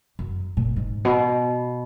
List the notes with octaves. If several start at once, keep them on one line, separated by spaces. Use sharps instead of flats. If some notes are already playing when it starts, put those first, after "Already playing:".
F#2
A#2
G#2
B2